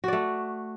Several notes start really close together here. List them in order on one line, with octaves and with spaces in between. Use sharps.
F#4 D5 A3